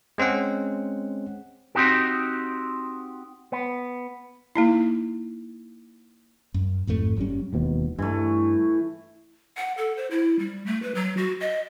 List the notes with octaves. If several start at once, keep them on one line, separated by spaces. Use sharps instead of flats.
G#3 C4 C#4 F#5
C4 D#4 F#4 G4
B3
A#3 D#4 E4
F#2
A1 F2 G#2 A3
F#1 F#3 G3 C#4
E1 D#2 B2
G2 E3 A3
F#5
A4
C5
E4
G3
A3
B4
F#3
F#4
D#5